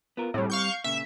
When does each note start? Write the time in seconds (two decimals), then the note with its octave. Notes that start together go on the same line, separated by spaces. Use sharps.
0.17 B3 F4 A#4
0.34 A2 G3 C4
0.50 F5 C#6 G6
0.84 A#2 C#3 E5